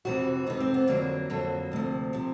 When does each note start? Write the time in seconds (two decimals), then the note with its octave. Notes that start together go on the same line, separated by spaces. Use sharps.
0.05 F2 C3 E3 F#4
0.46 F2 C3 E3 D#4
0.60 C4
0.74 B3
0.87 F2 D3 F#3 A#3
1.30 F2 D3 F#3
1.72 D2 C3 F3
2.13 C3 F3